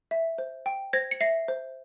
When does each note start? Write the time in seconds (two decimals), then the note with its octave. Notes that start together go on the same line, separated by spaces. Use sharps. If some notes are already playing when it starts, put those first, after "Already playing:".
0.11 E5
0.38 C5
0.66 G5
0.93 C5 G#6 A#6
1.11 C#7
1.21 E5 A#6 C7
1.48 C5